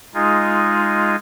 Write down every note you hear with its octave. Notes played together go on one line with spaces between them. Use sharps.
G#3 D#4 F4 G#4